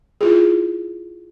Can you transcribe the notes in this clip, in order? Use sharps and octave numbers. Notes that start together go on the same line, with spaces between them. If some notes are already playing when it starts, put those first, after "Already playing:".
E4 F4 G#4